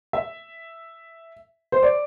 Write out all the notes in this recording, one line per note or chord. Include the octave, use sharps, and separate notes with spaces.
E5
C5
D5